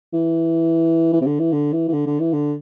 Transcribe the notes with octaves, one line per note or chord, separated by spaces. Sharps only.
E3
E3
C3
D3
E3
D3
E3
E3
D3
D3
E3
D3